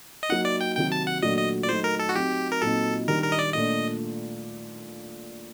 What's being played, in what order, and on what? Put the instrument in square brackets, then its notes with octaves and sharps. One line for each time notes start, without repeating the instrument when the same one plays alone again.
[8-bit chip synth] D#5
[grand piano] F#3 A#3 D#4 [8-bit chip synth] F#5
[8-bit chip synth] D5
G5
[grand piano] C3 D#3 F#3 [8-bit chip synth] G5
[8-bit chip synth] A5
F#5
[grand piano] A#2 F#3 A3 D4 [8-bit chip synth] D#5
[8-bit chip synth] D#5
D5
[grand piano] F#3 A3 D#4 [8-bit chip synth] C5
[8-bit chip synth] A#4
A4
F#4
[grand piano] F#3 C4 D#4 [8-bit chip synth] G4
[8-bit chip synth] A#4
[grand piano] A#2 F#3 C4 D#4 [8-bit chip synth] A4
[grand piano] D#3 G3 D4 [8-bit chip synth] A#4
[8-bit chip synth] A#4
D#5
D5
[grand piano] A#2 A3 D4 [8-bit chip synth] D#5